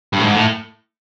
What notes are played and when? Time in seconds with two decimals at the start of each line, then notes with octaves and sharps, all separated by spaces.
0.13 G2
0.19 A2
0.24 G#2
0.35 A2